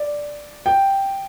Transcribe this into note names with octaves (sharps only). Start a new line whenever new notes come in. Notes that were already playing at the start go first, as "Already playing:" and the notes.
Already playing: D5
G5